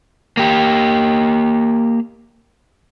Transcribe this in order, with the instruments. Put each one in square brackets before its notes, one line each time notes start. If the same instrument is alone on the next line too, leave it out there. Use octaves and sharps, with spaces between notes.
[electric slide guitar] A#3 G4